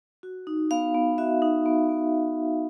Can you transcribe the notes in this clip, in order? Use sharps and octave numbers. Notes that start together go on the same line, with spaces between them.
F#4
D#4
B3 F5
B3
F#4 E5
D#4
B3
B3